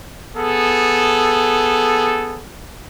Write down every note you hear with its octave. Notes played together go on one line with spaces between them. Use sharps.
B3 G#4 A4